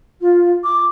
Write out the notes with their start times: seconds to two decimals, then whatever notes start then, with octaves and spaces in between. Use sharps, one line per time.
0.21 F4
0.64 D6